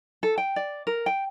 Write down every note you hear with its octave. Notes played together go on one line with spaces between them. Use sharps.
A4
G5
D5
A#4
G5